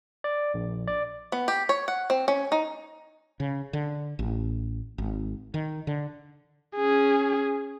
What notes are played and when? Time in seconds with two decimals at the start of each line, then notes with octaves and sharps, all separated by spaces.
0.24 D5
0.54 A#1
0.87 D5
1.32 B3
1.48 G4
1.69 C#5
1.88 F#5
2.10 C4
2.28 C#4
2.52 D#4
3.40 C#3
3.73 D3
4.19 A1
4.98 G#1
5.54 D#3
5.87 D3
6.76 C#4 G#4